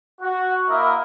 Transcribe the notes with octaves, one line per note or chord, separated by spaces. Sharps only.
F#4
A#3 E4 A#4 D#5 E5 D#6